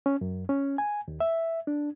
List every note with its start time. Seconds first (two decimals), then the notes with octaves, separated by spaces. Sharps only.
0.06 C#4
0.21 F#2
0.49 C#4
0.78 G#5
1.08 D#2
1.20 E5
1.67 D4